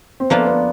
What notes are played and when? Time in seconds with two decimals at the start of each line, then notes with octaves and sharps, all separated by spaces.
0.20 C4
0.30 F3 A#3 B3 D4 F4
0.47 B3